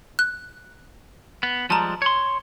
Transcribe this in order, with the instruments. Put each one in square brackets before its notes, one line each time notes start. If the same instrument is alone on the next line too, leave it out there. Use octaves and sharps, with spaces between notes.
[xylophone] F#6
[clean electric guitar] B3
[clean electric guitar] F3 G3 G#3 [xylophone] A5 A#5
[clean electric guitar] C#5 C6